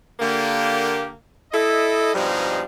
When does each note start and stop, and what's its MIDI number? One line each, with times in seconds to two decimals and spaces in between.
0.19 1.12 50
0.19 1.12 58
0.19 1.12 67
1.52 2.13 64
1.52 2.13 69
1.52 2.13 75
2.14 2.61 43
2.14 2.61 47
2.14 2.61 53
2.14 2.61 55
2.14 2.61 56
2.14 2.61 63